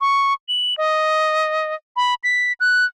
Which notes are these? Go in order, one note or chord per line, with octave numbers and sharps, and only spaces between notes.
C#6
F#7
D#5
B5
B6
F#6